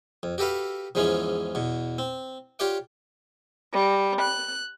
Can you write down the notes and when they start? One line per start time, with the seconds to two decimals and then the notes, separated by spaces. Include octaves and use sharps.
0.23 F2
0.38 F#4 G4 A4 B4 F5
0.95 E2 G#2 E3 F3 G#3 C#4
1.55 E2 B2
1.98 C4
2.59 F4 G4 C#5 D5 F#5
3.74 G3
4.21 F#6